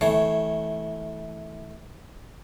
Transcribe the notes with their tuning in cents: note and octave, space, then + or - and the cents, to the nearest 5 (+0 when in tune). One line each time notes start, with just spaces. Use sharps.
E3 -25 A3 -10 C#5 +0